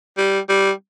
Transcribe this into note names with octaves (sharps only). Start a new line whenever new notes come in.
G3
G3